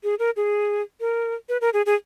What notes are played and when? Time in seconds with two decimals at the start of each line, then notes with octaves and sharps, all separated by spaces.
0.04 G#4
0.19 A#4
0.36 G#4
1.00 A#4
1.49 B4
1.61 A#4
1.73 G#4
1.86 G#4